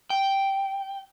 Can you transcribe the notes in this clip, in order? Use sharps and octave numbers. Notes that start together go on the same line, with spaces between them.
G5